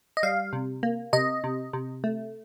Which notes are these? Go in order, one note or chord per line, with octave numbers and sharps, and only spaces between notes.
D#5
G3 F5
C3
A#3
C3 D#5
C3
C3
A3